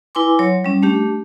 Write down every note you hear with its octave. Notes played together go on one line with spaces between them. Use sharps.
E4 B4 G#5 C6 D6
F#3 C#5
G3 C#4
A3 D4 G4